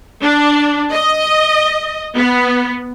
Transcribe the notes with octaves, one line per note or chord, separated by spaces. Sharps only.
D4
D#5
B3